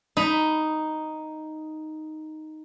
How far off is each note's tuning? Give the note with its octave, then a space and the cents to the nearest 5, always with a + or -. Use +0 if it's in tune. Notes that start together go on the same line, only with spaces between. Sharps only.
D#4 +0 B5 +0